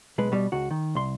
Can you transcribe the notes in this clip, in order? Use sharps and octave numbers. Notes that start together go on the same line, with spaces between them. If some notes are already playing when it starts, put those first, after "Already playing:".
B1 G#3 B4
B2 G3
C#2 F#4
D#3
C2 C6